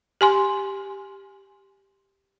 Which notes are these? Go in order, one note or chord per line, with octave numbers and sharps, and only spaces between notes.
G4 G#5 C6